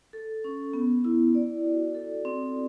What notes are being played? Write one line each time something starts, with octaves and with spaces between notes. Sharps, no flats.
A4
C#4
B3
E4
D5
F#4
A4
C4